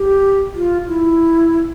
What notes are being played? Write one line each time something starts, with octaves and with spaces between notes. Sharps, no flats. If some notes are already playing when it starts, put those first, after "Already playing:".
Already playing: G4
F4
E4